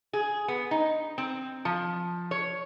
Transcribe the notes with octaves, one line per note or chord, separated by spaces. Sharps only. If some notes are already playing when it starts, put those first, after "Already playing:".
G#4
B3
D#4
C4
F3
C#5